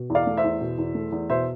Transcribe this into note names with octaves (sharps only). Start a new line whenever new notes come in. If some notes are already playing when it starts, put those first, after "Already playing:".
Already playing: B2
E2
D5 F5
A3
C5 E5
E2
B2
E2
A3
E2
B2 C5 E5